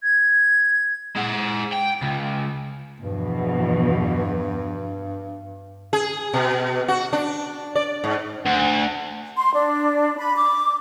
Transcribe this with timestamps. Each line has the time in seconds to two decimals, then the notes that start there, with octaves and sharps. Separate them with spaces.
0.03 G#6
1.16 G#3 F#5
1.72 G5
2.02 C#2
3.00 E2 G2 B2 F3
5.93 G#4
6.34 B2
6.88 F#4
7.13 D4
7.75 D5
8.04 G#2
8.46 D2 F#5
9.37 C6
9.53 D4
10.18 B5
10.36 D6